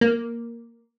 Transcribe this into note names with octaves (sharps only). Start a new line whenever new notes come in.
A#3